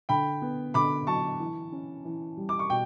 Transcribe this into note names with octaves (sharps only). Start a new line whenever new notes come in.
D3 G5 B5
B3
D3 B5 D6
F#3 A5 C#6
E3
C#4
E3
G3
D6
C#6
B2 G5